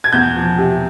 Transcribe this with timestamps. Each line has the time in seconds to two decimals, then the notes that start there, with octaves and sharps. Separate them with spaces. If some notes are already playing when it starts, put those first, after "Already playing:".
0.04 G#6
0.12 E2 G6
0.36 F3
0.58 C3